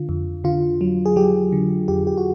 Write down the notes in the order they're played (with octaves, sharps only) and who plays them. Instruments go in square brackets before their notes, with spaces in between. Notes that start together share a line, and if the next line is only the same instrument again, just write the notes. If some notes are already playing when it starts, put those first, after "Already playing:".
Already playing: [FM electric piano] D3 F4
F2
D3 F4
F#3
G#4
F#3 G4
D3
F2 G4
G4
F#4